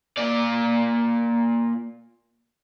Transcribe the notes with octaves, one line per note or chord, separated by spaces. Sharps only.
A#2 D5